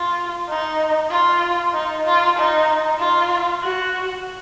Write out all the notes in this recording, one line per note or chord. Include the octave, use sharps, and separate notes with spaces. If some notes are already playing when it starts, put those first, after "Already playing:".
Already playing: F4
D#4
F4
D#4
F4
D#4
F4
F#4